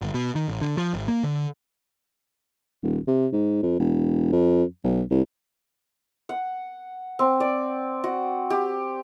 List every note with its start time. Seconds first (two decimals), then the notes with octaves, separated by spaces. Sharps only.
0.01 G1
0.14 B2
0.35 D#3
0.48 A1
0.61 D3
0.77 F3
0.94 G#1
1.08 A#3
1.23 D3
2.83 D#1
3.07 C3
3.33 G#2
3.62 F2
3.79 E1
4.32 F2
4.84 B1
5.11 C2
6.29 F#5
7.19 C4
7.40 D5
8.04 F#4
8.50 G4